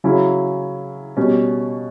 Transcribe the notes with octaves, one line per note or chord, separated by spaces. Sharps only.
C#3 F#3 C#4 E4
B2 G3 C#4